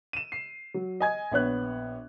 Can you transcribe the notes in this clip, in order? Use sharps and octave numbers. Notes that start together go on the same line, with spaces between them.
D#7 E7
C7
F#3
D#5 G#5 G#6
A#1 B3 C#5 F#6